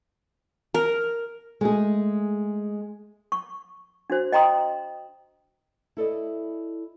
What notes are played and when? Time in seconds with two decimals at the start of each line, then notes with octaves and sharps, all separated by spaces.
0.74 A#4
1.61 G#3 A3 G#4
3.32 C#6
4.10 D4 F#4 C5
4.32 D#5 G5 A#5 C6 D#6
5.97 E4 A4 D5 D#5